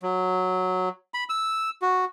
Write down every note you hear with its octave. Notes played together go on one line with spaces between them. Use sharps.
F#3
B5
E6
F#4